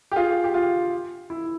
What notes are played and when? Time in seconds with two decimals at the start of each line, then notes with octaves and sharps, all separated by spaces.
0.11 G4
0.16 F4 G#4
0.44 G4
0.54 F4
1.30 E4